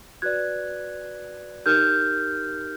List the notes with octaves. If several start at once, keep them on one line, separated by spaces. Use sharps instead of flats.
F#4 B4 D5 F#6 G#6
D#4 G4 A#4 F6 G6